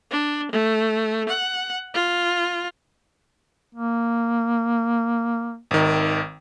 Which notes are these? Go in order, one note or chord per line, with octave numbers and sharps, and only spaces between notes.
D4
A3
F#5
F4
A#3
G#1 D#3